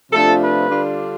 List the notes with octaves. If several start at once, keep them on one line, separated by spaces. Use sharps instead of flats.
C3 F3 A3 D4 F4 A4
B4
D3 G3 D4 F4